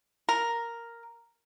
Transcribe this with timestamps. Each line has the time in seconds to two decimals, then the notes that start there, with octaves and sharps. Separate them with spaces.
0.29 A#4